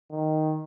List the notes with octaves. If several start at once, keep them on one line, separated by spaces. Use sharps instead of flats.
D#3